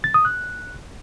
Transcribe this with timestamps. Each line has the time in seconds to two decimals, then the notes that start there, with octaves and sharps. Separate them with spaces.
0.04 A6
0.14 D#6
0.25 F#6